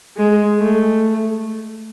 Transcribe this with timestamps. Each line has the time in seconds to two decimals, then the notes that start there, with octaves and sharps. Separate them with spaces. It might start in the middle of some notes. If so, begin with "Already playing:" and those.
0.17 G#3
0.59 A3